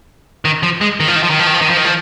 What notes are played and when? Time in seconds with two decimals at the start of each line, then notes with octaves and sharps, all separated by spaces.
0.45 D#3
0.63 F3
0.81 G#3
1.00 D#3
1.08 F3
1.16 D#3
1.23 F3
1.30 D#3
1.39 F3
1.47 D#3
1.54 F3
1.61 D#3
1.69 F3
1.77 D#3
1.85 F3